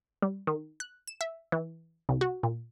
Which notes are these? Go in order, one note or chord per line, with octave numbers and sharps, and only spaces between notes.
G3
D#3
F#6
E7
E5
E3
C2
F#4
A#2